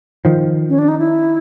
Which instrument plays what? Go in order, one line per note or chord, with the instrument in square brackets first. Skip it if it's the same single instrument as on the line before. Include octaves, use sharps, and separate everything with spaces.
[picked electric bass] D#3 F3
[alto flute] C#4
D4
D#4
E4